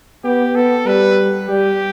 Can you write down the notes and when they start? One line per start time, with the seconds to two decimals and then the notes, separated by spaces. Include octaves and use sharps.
0.24 B3 G4
0.55 B3 A4
0.86 G3 B4
1.49 G3 G4